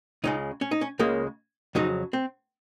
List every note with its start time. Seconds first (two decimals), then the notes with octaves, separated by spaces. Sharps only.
0.24 C#2 C#3 G#3 D#4
0.61 C#4
0.71 D#4
0.81 C#4
0.99 C#2 C#3 G#3 A#3
1.75 F2 C#3 F#3 D#4
2.13 C4